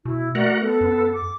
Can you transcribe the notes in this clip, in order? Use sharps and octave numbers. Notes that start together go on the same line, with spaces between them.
B2 E4
A3 F#4 A#4 D5 F#5
B3 A4
F#2
D6